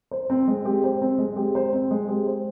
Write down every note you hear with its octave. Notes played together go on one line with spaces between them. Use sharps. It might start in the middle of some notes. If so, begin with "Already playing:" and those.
C5
C4
G#3
G4
C5
C4
G#3
G4
C5
C4
G#3
G4
C5